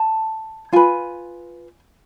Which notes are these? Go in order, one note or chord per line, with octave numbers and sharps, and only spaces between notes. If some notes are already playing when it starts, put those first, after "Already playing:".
Already playing: A5
F4 B4 G#5